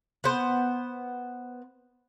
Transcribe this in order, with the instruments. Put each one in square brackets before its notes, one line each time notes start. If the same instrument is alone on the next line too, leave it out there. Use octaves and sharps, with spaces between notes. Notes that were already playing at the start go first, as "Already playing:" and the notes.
[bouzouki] B3 C5